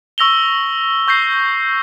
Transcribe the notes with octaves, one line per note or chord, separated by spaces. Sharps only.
C#6 E6 A#6 F7 G7
C#6 G6 A#6 C7